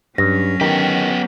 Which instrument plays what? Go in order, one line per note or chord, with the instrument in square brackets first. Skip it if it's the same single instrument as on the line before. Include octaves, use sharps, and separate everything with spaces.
[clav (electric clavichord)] G2 [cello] F#3 C#4 [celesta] A#6
[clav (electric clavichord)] D#3 [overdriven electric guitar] B3 G4